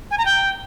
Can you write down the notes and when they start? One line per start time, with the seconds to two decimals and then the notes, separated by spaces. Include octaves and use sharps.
0.11 G#5
0.18 A#5
0.25 G5